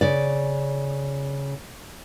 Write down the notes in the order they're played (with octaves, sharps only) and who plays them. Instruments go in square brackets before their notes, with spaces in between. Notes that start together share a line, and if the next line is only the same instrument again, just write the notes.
[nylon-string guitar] C#3 D5